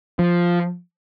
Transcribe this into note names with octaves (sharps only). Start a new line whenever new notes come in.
F3